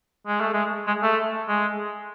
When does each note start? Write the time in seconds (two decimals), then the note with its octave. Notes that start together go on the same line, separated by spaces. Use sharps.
0.27 G#3
0.40 A3
0.53 G#3
0.87 G#3
1.03 A3
1.48 G#3